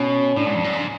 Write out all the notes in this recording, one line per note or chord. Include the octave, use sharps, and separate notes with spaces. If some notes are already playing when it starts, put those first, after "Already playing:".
Already playing: B2 C#4
A2 D4
G#2
F2
F#2
G#2